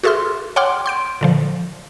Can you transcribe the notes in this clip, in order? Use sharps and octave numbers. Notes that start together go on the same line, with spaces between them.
F#4 G#4 A4 E5 C6 F6
C#5 F#5 G5 C6 D6 F6
C6 G6 D7
A#2 D3 F3